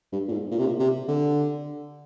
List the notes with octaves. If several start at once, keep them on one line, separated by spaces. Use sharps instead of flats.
G2
A#2
G#2
A#2
C3
A#2
C3
D3